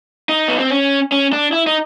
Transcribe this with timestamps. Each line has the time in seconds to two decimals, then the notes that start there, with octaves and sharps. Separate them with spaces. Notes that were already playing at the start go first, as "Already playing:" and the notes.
0.29 D#4
0.48 B3
0.59 C4
0.71 C#4
1.12 C#4
1.33 D4
1.53 E4
1.67 D#4